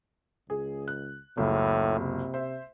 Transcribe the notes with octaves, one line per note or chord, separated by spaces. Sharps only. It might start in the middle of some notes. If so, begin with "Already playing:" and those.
C#2 G#4
F#6
F#1 C#2 A2
C3
C5 E5